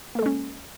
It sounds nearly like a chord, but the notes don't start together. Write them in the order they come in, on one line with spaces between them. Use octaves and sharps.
A#3 A4 G#3 C#4